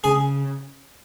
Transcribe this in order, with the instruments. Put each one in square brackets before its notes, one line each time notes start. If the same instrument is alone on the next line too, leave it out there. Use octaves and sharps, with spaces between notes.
[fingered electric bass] C#3 [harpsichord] G#4